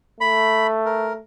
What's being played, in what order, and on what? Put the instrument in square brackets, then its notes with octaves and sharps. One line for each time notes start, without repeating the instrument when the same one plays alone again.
[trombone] A3 [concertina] B5
[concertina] A#4